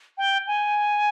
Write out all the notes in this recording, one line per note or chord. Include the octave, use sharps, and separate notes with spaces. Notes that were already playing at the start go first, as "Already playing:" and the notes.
G5
G#5